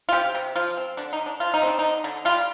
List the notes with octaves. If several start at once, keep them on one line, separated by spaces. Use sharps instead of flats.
F4
C3 G4
C3
F3 F4
C4
D3 D4
D#4
D3
D4
F3 F4
D#4
C4 D4
D3 D#4
D3
G3 F4